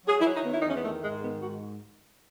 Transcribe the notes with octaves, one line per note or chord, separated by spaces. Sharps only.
F#3 G#4
E4
F#3
D#4
D#3 B3
E4
D#4
E2 C#4
B3
D#3 A3
G#2 G#3
D#3 B3
G#2 F#4